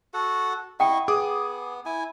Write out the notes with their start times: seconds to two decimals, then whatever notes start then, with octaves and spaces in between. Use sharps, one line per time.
0.14 F#4 A4 F#5
0.80 E4 D#5 F#5 G5 C#6
1.08 B3 G#4 D6 D#6
1.86 E4 G#5